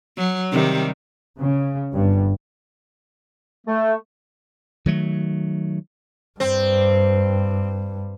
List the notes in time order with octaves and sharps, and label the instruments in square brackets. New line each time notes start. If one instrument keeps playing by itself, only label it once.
[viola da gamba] F#3
C3 D#3 G3
[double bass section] C#3
G1 G2
[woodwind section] A3
[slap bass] D#3 F#3 A3
[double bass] G2 [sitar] C4